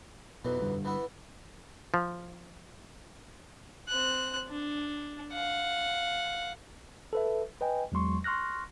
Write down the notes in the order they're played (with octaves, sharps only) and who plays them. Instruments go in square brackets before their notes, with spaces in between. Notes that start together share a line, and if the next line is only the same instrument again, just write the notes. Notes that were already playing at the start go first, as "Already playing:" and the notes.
[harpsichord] B1 F2 E3 [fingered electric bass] B2
[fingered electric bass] G2 D3 G3
[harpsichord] E3 B3 E4
[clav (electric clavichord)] F3
[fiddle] C4 F#6
D4
F5 F#5
[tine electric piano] A4 B4 E5
B4 D#5 G5 G#5
E2 F#3 G#3 C6 C#6
C6 C#6 F6 F#6 A#6